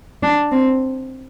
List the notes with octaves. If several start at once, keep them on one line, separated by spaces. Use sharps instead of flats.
D4
C4